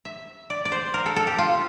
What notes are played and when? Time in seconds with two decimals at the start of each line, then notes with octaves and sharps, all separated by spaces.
0.05 E5
0.50 D5
0.65 D5
0.72 C5
0.94 A#4
1.06 A4
1.16 A4
1.27 G4
1.38 F4